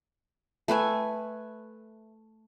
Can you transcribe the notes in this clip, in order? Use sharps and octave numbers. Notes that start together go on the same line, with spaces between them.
A3 B4 E5 G#5